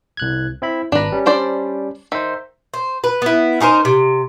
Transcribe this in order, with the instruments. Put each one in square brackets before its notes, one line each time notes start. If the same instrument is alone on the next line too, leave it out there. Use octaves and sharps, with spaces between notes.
[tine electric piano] C2 F#6 G#6
C4 E4 B5
[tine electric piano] G#1 A#5 [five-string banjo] D4 B4
[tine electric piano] G3 C#4
[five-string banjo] D4 C5 D5
[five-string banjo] D#3 [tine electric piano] C5 E5
[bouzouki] C5
B4
B3 E4
C#4 D#4 A#4 C5
C3